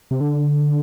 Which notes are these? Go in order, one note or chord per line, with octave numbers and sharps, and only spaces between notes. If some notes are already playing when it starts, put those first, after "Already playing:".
C3
D3